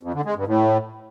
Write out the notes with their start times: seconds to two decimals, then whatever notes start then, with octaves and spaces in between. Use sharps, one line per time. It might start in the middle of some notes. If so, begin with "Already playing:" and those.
0.03 F2
0.14 D3
0.25 G#3
0.36 G2
0.47 A2